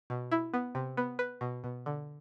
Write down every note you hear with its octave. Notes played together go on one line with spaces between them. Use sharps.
B2
E4
B3
C3
B3
B4
B2
B2
D3